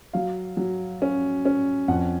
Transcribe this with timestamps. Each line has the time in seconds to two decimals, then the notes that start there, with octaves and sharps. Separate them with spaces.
0.13 F#3 F5
0.57 F#3
1.02 C#4
1.45 C#4
1.88 F2 F#5